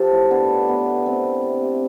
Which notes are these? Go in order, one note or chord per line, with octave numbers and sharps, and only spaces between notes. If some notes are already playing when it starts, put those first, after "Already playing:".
Already playing: F3 G4 A4 C5
A2
A2 B3 D4
A2
A3 B3
A3
A3 C4
A3
C3
C3